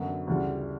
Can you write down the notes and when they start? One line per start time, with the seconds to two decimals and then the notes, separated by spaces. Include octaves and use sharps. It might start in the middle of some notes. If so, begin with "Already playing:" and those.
Already playing: F#2 D3 F#3 B3
0.27 D2 C#3 E3 G3